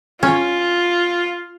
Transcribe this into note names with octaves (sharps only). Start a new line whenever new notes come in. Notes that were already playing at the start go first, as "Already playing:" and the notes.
C#4 F4 C#5